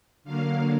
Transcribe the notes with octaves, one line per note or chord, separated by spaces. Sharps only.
D3 F#3 A#3 F5